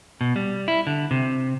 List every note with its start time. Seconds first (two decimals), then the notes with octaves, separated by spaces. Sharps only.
0.21 B2
0.36 G3
0.68 E4
0.87 D3
1.11 C3